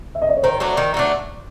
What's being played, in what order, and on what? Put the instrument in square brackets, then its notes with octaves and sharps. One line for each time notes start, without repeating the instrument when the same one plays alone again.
[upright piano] E5
D#5
D5
C#5
[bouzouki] D#3 [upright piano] C5
[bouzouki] F#3 A3 D4
D#3
F#3 A3 D4